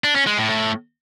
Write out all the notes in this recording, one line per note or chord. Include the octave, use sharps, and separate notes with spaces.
D4
C#4
G#3
A2
A2